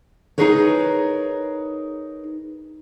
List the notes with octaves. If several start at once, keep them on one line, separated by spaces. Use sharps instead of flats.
D#4 F4 G#4 A#4 B4 C#5